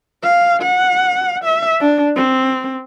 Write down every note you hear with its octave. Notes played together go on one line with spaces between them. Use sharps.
F5
F#5
E5
D4
C4